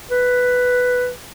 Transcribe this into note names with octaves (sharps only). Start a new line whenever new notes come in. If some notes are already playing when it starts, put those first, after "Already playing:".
B4